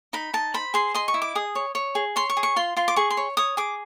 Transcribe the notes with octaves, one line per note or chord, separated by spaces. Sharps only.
D#4 B5
D#4 A5
C5 B5
G#4 C6
D#5 C6
C#6
E4
D6
G#4 D#6
C#5
C#5
G#4
C#5 C6
C#6
G#4
C#6
F4 C6
F4 C6
D6
G#4 C#6
C6
C#5
C#5 D#6
G#4 D6